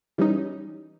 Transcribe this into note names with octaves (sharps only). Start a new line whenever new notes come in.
E3 G3 C#4 D#4